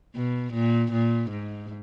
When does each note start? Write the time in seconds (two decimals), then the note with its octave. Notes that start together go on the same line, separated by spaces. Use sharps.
0.15 B2
0.53 A#2
0.92 A#2
1.30 G#2